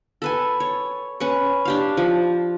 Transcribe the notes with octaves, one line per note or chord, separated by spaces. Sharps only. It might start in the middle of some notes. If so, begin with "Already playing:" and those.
A4 B4 G#5
C#5
C#4 B4 C#6
D4 G4 F5
F3